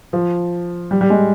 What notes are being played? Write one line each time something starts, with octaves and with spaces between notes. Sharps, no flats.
F3
G3
G3
G#3